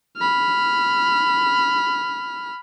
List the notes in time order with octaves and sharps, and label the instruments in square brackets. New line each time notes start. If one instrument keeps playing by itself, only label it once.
[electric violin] B5 F6